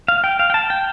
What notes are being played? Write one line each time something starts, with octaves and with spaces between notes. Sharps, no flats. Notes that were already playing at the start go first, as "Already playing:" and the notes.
F5
G5
F5
G5
A5
G5